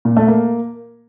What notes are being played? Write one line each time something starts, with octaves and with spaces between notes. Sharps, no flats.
A#2
A3
A#3